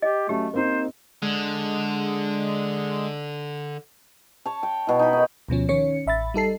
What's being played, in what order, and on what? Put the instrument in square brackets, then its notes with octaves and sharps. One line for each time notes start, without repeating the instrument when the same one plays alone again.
[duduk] G4 [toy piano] D#5
[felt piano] F#3 C#4 [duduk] A3 [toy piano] G4
[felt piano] A#3 C4 D#4 [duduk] C5
[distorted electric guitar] D3 [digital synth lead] G#3
[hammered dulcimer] C#5 A5
G5
B2 E4
D#4 B5
D#4 A#4
[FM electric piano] D2 B2 F3 C#4
D#3 C#4 C#5 C#7
A1 E5 B5 A6
G3 D#4 A4 C7